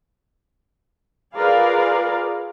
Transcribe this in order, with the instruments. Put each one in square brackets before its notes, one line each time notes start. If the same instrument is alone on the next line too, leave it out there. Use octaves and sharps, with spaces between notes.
[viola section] F4 G#4 A#4 B4 D5 F5